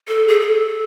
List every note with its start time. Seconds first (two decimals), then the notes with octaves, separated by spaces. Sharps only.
0.08 A4
0.28 G#4
0.40 A4